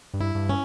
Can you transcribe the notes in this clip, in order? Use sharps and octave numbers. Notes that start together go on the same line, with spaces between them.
G2
E4
G2
C#4